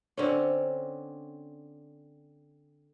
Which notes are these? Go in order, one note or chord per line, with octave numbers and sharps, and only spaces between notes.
D3 C4 C#4